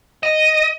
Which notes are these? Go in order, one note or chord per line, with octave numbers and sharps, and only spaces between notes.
D#5